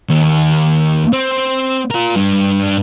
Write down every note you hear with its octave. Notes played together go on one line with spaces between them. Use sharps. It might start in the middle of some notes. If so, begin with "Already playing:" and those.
D#2
C4
F4 A#4
G2 G3